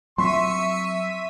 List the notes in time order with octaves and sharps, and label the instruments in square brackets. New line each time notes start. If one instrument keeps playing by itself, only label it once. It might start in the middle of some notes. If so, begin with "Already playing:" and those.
[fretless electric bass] F#3 C4 [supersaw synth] E5 B6 D#7 [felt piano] C6 [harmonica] C#6